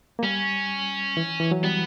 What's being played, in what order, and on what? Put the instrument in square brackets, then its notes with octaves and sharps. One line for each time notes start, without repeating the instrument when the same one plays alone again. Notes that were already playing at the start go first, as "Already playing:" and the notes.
[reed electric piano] A#3
[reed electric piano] G3 [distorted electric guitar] C#4
[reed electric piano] E3
E3
F#3
[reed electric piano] G3 [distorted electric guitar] B3